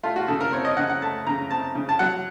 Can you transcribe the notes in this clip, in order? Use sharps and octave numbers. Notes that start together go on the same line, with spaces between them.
A3 F4
F#4
C#3 A4
A#4
C4 C#5
D#5
C#3 F#5
F#5
A3 A5
C#3 A#5
C4 A5
C#3
A5
F#3 F#5